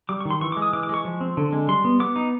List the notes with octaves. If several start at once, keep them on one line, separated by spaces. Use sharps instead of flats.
G3 D6
C#6
D#3
C6
E3 C#6
G#3 D6
D#6
E3 D6
D6
G#3 C#6
F3
C4
D3
G#3
G3 C6
B3
B3 D6
D#4